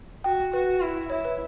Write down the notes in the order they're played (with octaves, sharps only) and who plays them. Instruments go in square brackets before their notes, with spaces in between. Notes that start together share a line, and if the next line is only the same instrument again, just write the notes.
[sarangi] F#4 [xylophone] G5
[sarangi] F#4 [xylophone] B4
[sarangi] E4
[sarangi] E4 [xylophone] C#5
[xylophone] B4